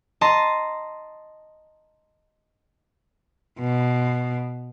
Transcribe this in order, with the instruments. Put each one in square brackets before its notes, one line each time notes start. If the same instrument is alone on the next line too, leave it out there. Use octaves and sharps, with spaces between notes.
[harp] D#5 A5 A#5 C6
[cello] B2